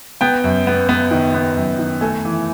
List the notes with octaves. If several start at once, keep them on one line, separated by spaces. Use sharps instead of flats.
B3 G5
F#2
B3
B3
D#3
B3
F#2
D#3
A3 G#5
E3